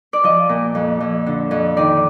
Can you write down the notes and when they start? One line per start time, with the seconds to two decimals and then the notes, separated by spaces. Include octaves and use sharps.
0.13 D5
0.24 F3 D#5
0.49 A#2
0.75 F2
1.00 F2
1.26 D3
1.51 F2
1.77 D#3 D5